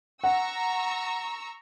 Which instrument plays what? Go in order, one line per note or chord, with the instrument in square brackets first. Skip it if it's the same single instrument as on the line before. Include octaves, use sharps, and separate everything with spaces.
[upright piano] F#5 [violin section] A#5 C#6 E6